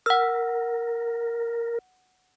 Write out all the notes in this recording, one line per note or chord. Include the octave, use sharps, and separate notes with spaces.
A#4 F#5 E6